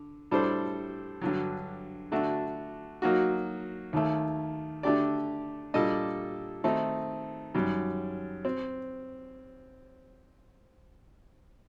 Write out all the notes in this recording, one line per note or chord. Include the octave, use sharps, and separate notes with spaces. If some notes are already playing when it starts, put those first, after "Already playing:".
Already playing: D3
A2 G3 D4 A4 C5
G2 D3 F#3
D3 A3 D4 F#4
F#3 A#3 D#4 F#4
D#2 D#3 A3
D3 A3 D4 G4 D5
A#2 G3 D4 A4 D#5
D#3 A3 C4 D#4
F#2 D#3 G3
C4